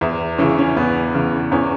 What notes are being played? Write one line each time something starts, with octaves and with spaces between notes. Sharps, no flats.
E2 E4
C#3 E3 C#4
E4
C#4
E2 B3
C#3 E3
E2 C#4